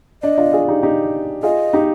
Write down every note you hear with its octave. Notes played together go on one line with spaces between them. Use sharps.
D4 D#5
D4 F4
F4 G#4
D#4 G4
D#4 G4
F4 G#4 D#5
D#4 G4